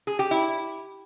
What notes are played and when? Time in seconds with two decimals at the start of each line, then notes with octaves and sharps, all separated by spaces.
0.07 G#4
0.19 G4
0.31 E4